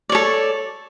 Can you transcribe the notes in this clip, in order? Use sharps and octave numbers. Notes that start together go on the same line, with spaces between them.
A4 C#5 D5